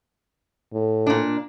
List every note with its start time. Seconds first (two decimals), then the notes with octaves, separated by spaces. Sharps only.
0.73 A2
1.07 A#2 D4